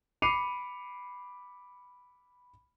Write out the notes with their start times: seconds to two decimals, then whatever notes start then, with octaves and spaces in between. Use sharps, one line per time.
0.22 B5 D6 C7 C#7 D#7 F7